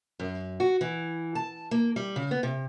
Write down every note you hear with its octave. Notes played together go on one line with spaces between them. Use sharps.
F#2
F#4
E3
A5
A#3
G3
C#3
B3
C3